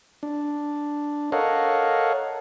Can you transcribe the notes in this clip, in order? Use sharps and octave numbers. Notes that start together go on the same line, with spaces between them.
D4
A4 A#4 C#5 D#5 F5 F#5